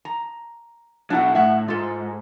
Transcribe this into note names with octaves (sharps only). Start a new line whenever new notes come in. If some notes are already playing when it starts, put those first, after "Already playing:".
A#5
B2 F#3 D4 E4 F#5
A2 E5 F#5
G#2 F4 A4